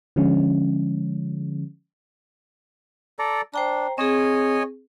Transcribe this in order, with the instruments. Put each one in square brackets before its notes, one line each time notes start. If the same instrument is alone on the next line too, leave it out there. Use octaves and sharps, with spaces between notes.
[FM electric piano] D3 F3 G#3 C#4
[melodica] A4 D5 A#5
[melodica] D4 [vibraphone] C5 G5 A#5
[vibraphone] C4 G#4 [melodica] C#5 D#5 G#5